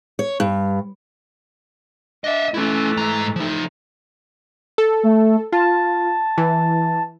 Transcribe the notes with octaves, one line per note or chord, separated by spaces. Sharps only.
C#5
G2
D4 D#5 E5
E3 A3 C#4 E4
G#2 A#5
F3 D#4
A4
A3
F4 A5
E3